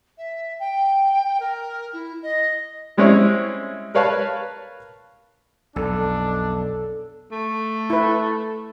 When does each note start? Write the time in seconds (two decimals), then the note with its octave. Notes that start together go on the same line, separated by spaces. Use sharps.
0.17 E5
0.59 G5
1.40 A#4
1.93 E4
2.22 D#5
2.97 G3 G#3 C4 C#4 E4 C#5
3.95 A#4 B4 C#5 F5 A5 B5
5.76 B1 F2 D4 A4
7.31 A3
7.90 E4 B4